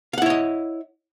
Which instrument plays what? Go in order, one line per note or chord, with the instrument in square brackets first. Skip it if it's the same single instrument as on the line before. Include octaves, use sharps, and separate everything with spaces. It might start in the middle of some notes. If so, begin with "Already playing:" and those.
[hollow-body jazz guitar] F5
F#5
E4
C#5
D#5